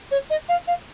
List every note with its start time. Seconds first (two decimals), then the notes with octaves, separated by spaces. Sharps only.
0.11 C#5
0.30 D#5
0.49 F5
0.67 F5